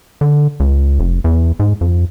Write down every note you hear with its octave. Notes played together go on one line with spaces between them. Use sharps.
D3
C#2
F1
E2
G#2
F2